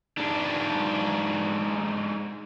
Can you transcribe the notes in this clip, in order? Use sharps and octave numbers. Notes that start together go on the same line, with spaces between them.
G#2 D4